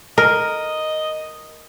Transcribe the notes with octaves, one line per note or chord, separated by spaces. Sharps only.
A#4 D#5